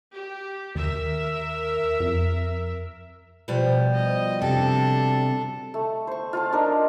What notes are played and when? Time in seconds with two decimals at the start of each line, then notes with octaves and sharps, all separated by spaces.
0.12 G4
0.75 D#2 A#4 E5
2.00 F2
3.48 B2 F3 G3
3.94 D#5
4.42 C3 D4 A4
5.74 A3
6.07 C5 C#6
6.33 F4 C5 A5
6.52 D4 D#4 A#4